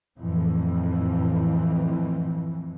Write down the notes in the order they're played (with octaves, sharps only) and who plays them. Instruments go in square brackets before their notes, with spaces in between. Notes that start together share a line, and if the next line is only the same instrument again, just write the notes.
[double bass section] F2 A2 E3